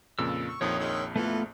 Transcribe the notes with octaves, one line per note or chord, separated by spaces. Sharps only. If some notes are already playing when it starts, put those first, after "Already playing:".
F2 A#2 C#3 E6
C#6
A#1 F2 D#3 F3 C#5 D#6
D#3 G#3 E6
E3 A3 B3 F4 A4